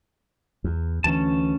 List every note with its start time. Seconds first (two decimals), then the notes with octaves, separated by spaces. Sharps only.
0.64 E2
1.04 D2 E3 C#4 A5